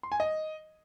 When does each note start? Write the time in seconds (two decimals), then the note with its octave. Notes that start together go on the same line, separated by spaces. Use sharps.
0.03 C6
0.12 G#5
0.20 D#5